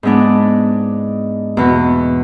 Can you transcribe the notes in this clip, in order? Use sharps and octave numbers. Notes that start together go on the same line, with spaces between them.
G#2 G#3 B3 D4
E2 B2 B3